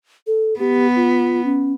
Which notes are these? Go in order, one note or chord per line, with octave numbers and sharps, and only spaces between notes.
A4
B3 G4
F4
C#4